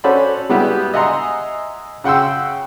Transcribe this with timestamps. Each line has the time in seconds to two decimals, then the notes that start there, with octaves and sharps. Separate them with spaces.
0.04 C#4 F#4 A4 C5 D5 B5
0.49 G3 G#3 B3 E4 F#4 G4
0.94 D#5 E5 F#5 G#5 A#5 C6
2.04 C#3 F#5 G5 C6 E6